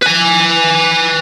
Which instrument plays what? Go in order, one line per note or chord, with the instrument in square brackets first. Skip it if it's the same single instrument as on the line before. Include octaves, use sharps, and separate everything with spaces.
[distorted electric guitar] B4 G#5